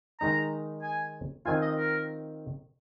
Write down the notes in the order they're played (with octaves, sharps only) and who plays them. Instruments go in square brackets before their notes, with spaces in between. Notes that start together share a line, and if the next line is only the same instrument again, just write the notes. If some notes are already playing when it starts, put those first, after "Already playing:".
[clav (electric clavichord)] D#3 G#3 D#4 [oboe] A#5
[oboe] G#5
[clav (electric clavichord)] D#3 C4 F4 [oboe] G#5
[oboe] D#5
A#4